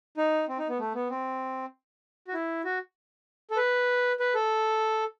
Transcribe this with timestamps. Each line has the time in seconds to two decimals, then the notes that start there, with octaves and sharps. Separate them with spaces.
0.17 D#4
0.49 C4
0.58 D#4
0.69 B3
0.79 A3
0.94 B3
1.10 C4
2.28 F#4
2.34 E4
2.65 F#4
3.51 A4
3.57 B4
4.20 B4
4.35 A4